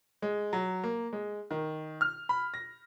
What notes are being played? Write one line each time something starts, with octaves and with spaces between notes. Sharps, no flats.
G#3
F#3
A#3
G#3
D#3
F6
B5
A#6